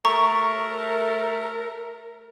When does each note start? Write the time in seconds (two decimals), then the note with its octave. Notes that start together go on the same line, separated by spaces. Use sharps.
0.05 A3 A#4 A#5 C#6